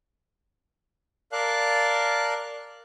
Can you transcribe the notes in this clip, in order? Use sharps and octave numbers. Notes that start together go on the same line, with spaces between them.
A#4 D5 F5 A5 F#6